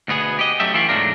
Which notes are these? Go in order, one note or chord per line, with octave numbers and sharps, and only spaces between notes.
D2 B2 B3 G#4
G4 D#5
F#2 F#3 A3 G4 E5
E3 A3 E4 F4 G4
E2 G#2 C#3 A3 D4 A#4